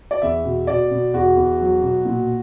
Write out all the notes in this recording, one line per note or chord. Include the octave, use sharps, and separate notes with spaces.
D5
E2 E5
B2
B2 D5
B2
E2 F#4
E2
F#3
B2
A#2